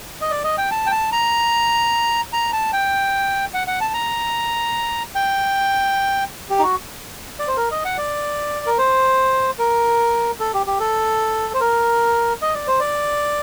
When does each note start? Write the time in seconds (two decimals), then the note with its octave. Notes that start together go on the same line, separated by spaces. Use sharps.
0.21 D#5
0.31 D5
0.44 D#5
0.58 G5
0.71 A5
0.86 G5
0.92 A5
1.12 A#5
2.33 A#5
2.53 A5
2.73 G5
3.54 F#5
3.67 F#5
3.81 A5
3.94 A#5
5.15 G5
6.50 G4
6.59 D#4
6.63 F#4
7.39 D5
7.48 C5
7.57 A#4
7.71 D#5
7.85 F#5
7.97 D5
8.66 A#4
8.78 C5
9.59 A#4
10.40 A4
10.54 G4
10.66 G4
10.80 A4
11.54 C5
11.61 A#4
12.42 D#5
12.55 D5
12.67 C5
12.80 D5